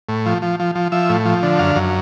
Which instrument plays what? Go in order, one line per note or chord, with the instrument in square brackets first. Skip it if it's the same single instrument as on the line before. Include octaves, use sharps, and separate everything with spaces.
[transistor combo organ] A2
F3
F3
F3
F3
F3 E5
A2
F3
D3
F#2 F5
F#2